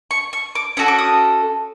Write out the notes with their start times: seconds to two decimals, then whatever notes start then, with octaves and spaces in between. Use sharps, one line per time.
0.11 C#6
0.33 C#6
0.55 D6
0.77 C#4 F#4 A4 D#6
0.88 D6
0.98 D#6